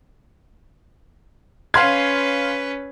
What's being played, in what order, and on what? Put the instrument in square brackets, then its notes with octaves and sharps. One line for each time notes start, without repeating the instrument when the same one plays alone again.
[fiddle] C#4 B4 [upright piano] F5 C6 G#6